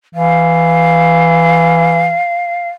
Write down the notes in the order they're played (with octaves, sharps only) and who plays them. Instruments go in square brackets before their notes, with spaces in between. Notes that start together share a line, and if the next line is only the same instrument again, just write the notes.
[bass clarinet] E3 [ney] F5